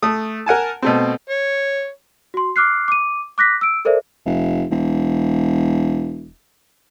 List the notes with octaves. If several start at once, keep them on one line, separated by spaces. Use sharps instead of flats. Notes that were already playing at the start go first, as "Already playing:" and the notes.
A3 D#6
A#4 F#5 G#5 A5
B2 A3 C4
C#5
F#4 C6
D6 F6 F#6 C7
D6 D#7
D6 F#6 A#6 B6
E6 D7
A4 A#4 C5 D5 E5
F1
E1